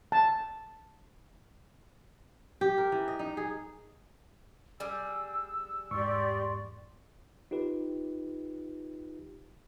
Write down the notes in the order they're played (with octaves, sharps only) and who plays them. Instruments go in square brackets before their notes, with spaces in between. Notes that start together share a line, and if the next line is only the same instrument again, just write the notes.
[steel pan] A5
[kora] G4
A#4
E3
D#5
D#4
G#4
[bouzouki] G3 G#4 [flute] E6
[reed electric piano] E2 G#2 C#6 [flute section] G4 D5 C6
[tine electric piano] D#4 F4 G4 B4